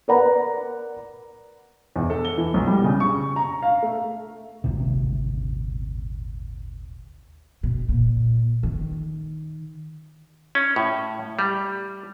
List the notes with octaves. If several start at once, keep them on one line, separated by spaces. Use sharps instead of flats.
A#4 B4 D5 F#5 A#5
E2
A4
G7
E3
B1
G3
C#3
C#6
A#5
F5
A3
D#1 G#1 D2 C3
B2
A#2
D#3
C#4
A2
G3